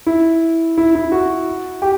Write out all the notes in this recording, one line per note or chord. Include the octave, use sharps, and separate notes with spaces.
E4
E4
E4
F#4
G4